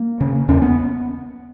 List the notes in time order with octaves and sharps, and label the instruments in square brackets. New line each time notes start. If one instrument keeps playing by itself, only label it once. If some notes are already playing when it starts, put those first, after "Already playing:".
Already playing: [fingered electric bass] A#3
C#3
E2 C#4
B3